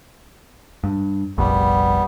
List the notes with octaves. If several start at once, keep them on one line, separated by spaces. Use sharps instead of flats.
G2
F1 A#1 G3 B3